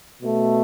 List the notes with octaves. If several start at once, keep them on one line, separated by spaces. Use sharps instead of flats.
B2 A3